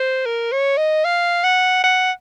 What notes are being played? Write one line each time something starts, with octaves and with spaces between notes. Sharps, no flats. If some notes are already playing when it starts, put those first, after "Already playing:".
Already playing: C5
A#4
C#5
D#5
F5
F#5
F#5